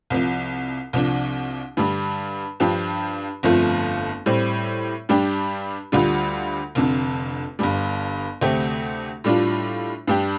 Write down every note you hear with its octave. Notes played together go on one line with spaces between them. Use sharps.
C2 C3 F3
C2 C3 F3 D4
G2 D3 G3
G2 F3 D4 G4
G1 F2 F3 A3 F4
A2 G3 C4
G2 G3 D4 G4
D2 D3 G3 F4
F1 F2 D3
G1 G2 G3
D2 C3 A3 C4 G4
A2 G3 D4 F4
G2 G3 D4 G4